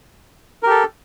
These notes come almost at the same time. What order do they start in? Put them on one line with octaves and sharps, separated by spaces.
A#4 G4 A4